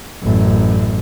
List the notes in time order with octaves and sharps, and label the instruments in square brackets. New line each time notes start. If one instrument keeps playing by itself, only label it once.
[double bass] A1 F#2